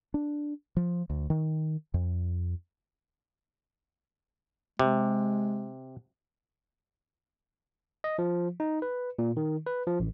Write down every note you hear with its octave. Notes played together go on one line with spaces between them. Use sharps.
D4
F3
D2
D#3
F2
C3 G#3
D#5
F3
D#4
B4
A#2
D#3
B4
F3
A1